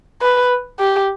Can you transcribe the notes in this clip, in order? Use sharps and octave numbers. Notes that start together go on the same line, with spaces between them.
B4
G4